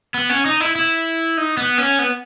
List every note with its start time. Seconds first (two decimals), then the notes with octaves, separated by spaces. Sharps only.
0.14 B3
0.29 C#4
0.45 D#4
0.60 E4
0.76 E4
1.37 D#4
1.57 B3
1.78 C#4
1.99 B3